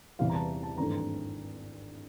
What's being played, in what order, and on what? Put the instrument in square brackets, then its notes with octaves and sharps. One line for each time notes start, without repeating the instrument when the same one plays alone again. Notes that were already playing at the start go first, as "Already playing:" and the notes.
[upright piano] E2 C3 E3 G3 F5
A#5
A5
A5
G#1 G2 E3 A3 C4 A#5
A#5